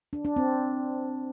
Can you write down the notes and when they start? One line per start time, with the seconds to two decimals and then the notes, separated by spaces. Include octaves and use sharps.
0.13 D4
0.25 D4
0.36 C4